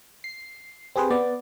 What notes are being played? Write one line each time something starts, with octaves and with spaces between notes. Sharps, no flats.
C7
C4 G4 G#4 B4 C5
B3 D5